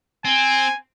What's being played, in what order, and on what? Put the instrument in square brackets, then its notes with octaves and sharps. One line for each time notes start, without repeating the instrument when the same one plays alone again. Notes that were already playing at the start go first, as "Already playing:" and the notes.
[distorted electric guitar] C4 [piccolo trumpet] G#5